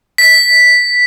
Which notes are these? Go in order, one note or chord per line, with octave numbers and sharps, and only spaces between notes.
B6